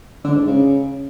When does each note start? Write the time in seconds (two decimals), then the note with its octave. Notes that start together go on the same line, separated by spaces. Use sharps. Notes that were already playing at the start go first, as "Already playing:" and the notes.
0.24 D3
0.36 G#2
0.47 C#3